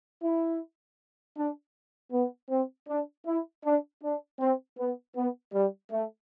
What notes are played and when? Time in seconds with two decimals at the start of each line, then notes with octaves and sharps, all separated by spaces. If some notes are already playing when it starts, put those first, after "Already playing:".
0.23 E4
1.37 D4
2.12 B3
2.50 C4
2.88 D4
3.26 E4
3.64 D4
4.03 D4
4.40 C4
4.78 B3
5.16 B3
5.53 G3
5.92 A3